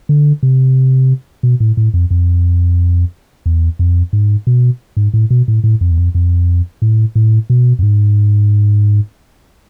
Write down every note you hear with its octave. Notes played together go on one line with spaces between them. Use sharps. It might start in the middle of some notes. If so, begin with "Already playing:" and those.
D3
C3
B2
A2
A2
F2
F2
E2
F2
G#2
B2
G#2
A2
B2
A2
A2
F2
E2
F2
F2
A2
A2
B2
F2
G#2